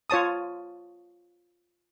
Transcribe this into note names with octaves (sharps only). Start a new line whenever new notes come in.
F4 C#5 A5 D#6